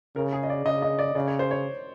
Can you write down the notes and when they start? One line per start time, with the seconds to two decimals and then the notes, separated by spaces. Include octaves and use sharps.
0.16 C#3 A#4
0.33 G#4
0.43 D#5
0.50 D5
0.65 C#3 D#5
0.82 D#5
0.99 D5
1.15 C#3 D5
1.28 C#5
1.39 C5
1.51 C#5